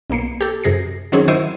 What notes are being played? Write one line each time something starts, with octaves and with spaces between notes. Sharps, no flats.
B1 B2 A#3 C7 C#7
G4 A4
F#2 C3 G#4 A#6 C7
D#3 F#3 C4 C#4 D#4 G#4
D#3 F#3 E4 C5 C#6 D#7